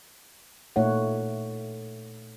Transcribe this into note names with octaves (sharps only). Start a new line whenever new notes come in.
A#2 A3 D#4 C#5 F#5